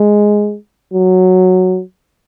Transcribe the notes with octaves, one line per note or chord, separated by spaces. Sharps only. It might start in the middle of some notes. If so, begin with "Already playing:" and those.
Already playing: G#3
F#3